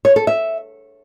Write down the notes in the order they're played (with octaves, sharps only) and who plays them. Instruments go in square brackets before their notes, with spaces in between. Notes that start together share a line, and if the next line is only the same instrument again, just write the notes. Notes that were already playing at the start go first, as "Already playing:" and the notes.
[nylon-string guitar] C#5
A4
E5